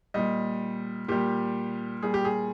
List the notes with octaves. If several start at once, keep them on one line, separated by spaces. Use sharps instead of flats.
A#2 G3 D#5
A#2 G3 G4
A#2 G3 G#4
G4
G#4